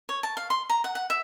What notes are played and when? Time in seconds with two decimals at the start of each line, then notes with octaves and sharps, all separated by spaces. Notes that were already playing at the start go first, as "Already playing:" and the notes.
0.09 C#5
0.23 A5
0.37 F5
0.50 C6
0.69 A#5
0.84 F#5
0.95 F#5
1.10 E5